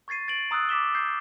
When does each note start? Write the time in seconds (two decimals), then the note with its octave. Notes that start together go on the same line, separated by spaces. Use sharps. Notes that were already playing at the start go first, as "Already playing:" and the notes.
0.08 C#6 G#6 A6 C7 D#7
0.28 A6 D7 F#7
0.51 A#5 D#6 E6 F#6 A6
0.69 D6 B6 E7 G7
0.95 G6 A6 C7